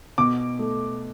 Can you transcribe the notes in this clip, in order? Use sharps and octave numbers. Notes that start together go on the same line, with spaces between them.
B2 D6
A3